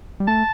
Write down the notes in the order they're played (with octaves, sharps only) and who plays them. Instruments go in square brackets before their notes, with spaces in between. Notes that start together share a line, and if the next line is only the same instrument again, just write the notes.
[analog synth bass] G3
[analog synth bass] A3 [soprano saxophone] A5